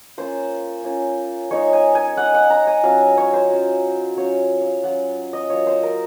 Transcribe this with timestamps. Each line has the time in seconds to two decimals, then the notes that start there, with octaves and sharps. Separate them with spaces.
0.18 A#3 C#4 F4 C5
0.84 A#3 C#4 F4
1.51 G#3 D#4 C#5
1.73 G#5
1.95 G#5
2.17 G#3 D#4 F#5
2.34 F#5
2.50 A#5
2.67 G#5
2.83 F#3 C#4 F4 F5
3.17 C#5
3.33 C5
3.50 F#3 C#4 F4
4.17 F#3 C#4 F4 C#5
4.61 F5
4.83 F#3 C#4 F4 F#5
5.33 D#5
5.50 F#3 A#3 F4 C#5
5.67 C5
5.83 A#4